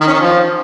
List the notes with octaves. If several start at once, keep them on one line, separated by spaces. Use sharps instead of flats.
D#3
C#4
D#3
F3